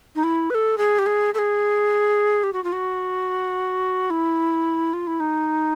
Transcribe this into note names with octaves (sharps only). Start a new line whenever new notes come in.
D#4
E4
B4
A4
G#4
G4
G#4
A4
G#4
G4
F#4
F4
F#4
E4
F4
E4
D#4